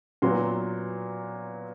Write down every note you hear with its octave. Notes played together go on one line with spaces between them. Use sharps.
A#2 F#3 B3 C6